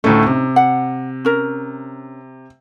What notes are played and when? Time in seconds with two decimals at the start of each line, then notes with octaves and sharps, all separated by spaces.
0.04 D2 A2 A3 C#4 D#4
0.26 C3
0.56 F#5
1.25 C#4 A#4